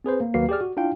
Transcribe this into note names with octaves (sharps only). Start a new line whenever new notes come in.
C4 G#4 B4 C5
A#3
D#2 F#3 A#3 F#4 B4 C7
G4 G#4 D5 F6
F#4
D4 E4 F4 F5 G5